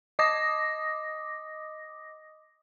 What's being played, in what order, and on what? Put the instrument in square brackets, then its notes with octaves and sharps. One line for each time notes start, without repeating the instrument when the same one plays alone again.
[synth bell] D#5 D6 D#6 A#6